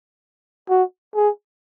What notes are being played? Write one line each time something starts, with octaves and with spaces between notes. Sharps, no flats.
F#4
G#4